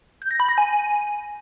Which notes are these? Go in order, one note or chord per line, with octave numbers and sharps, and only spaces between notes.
G6
A#6
B5
A#6
G#5